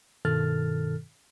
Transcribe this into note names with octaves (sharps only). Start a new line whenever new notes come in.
G2 B2 D#3 A4 F6 A6